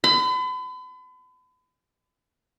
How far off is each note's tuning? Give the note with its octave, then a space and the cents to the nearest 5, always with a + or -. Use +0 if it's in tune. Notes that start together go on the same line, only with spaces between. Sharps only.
B5 +40